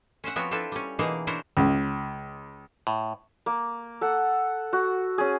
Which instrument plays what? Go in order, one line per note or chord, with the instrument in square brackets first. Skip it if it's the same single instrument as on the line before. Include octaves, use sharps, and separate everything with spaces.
[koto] C#4 C5 E5 F#5
F3 B3 C4 F#4 C5 C#5
C4 D4 E4 F4 A4 B4
G3 C#4
B2 E3 A#3 D#4 G#4 A#4
D4 E4 A#4 C5 C#5 F#5
[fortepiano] C#2
[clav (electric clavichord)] A2
[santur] A#3
A4 F#5
F#4
C#4 G#4